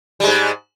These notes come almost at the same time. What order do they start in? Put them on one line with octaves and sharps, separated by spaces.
G3 G#3 G#2